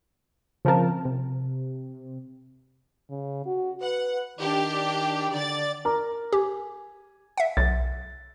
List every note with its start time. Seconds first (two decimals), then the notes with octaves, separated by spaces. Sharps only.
0.65 C#3 F3 C4 A#4 A5
1.05 C3
3.10 C#3
3.46 F#4
3.81 B4 F#5
4.40 D#3 D4 G4
5.32 D3 D5 A6
5.85 A#4 A#5 D6
6.32 G4 G#5
7.37 E5 F#5
7.57 B1 A6